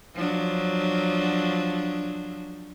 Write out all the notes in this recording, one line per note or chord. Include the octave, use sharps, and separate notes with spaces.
F3 F#3 D4